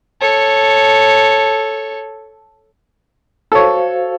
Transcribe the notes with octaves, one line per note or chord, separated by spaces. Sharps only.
A4 C#5
F#4 A4 C5 C#5 F5